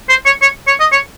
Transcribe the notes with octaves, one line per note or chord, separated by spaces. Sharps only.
C5
C#5
C#5
C#5
D#5
C#5